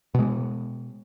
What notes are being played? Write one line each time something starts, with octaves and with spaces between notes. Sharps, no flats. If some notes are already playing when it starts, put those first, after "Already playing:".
B2 G#3